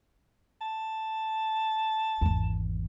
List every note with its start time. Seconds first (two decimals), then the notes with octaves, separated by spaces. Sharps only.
0.61 A5
2.21 G#1 E2